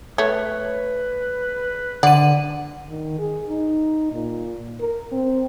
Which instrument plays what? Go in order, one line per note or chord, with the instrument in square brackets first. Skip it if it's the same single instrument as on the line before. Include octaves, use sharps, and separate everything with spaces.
[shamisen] A3 [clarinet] B4 [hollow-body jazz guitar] C#5
[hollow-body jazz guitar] D3 [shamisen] D5 [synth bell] F#5 D#7
[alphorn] D#3
G#4
D#4
A#2
A#4
C4